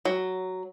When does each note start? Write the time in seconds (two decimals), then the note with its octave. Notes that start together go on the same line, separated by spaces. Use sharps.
0.05 F#3